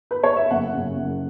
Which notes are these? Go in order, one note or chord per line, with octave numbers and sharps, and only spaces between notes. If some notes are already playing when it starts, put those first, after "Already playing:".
B4
C#5
E5
F#1 F#5
F#2 C#3
F#1